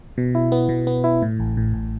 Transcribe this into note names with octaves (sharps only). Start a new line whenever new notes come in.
B2
E4
B3
B2
B3
E4
A2
A1
A2
A1